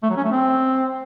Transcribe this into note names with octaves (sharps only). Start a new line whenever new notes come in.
A3
F#3
C#4
A3
C4